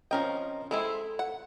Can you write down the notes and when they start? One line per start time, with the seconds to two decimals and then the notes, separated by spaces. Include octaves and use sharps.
0.11 F3 C4 C#4 A#4 D#5 G5
0.71 G#3 C4 E4 A4
1.19 F#5